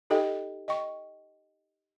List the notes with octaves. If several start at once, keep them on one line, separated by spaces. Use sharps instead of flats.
D#4 G4 A4 D#5 G5
D#5 G5 C#6